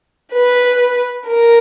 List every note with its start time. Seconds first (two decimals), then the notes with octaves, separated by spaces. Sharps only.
0.33 B4
1.26 A#4